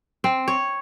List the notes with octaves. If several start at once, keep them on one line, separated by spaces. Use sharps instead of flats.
C4
C#5